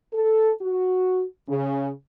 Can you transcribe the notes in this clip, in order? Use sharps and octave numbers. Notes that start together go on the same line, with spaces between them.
A4
F#4
C#3